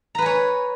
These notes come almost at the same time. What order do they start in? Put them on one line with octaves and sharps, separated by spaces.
A#5 B4 G#5 C#5